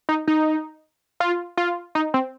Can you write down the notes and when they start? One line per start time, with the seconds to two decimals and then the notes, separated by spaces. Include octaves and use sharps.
0.09 D#4
0.28 D#4
1.20 F4
1.57 F4
1.95 D#4
2.14 C4